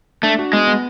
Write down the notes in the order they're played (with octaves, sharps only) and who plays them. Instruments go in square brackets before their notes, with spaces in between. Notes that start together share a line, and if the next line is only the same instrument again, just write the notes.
[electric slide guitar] A3 [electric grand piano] D4
[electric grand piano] F#4
[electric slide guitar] G#3 [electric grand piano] B3
[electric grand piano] B3